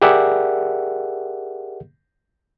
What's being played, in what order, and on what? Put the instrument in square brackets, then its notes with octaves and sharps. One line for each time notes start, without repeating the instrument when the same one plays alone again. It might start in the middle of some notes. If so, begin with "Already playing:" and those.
[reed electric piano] G4 G#4 A#4 D5 E5 F#5